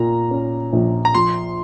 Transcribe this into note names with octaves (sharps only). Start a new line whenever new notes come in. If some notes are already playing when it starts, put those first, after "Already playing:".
Already playing: A#2 A#5
C#4
A#1
A#5
F3 C6